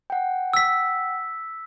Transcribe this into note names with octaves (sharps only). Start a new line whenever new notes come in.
F#5 G5
E6 B6